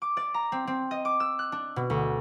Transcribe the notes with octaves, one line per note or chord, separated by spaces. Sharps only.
D6
D5
A#5
C4
C4
D#5
D6
E6
F#6
D4
B2
D2